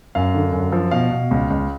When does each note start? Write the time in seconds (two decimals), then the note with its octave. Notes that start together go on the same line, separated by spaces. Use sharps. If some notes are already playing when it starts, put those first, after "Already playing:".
0.15 F#2 F5
0.34 D3
0.53 F#2
0.72 F3
0.91 B2 F5
1.11 B2
1.31 C#2
1.50 C#2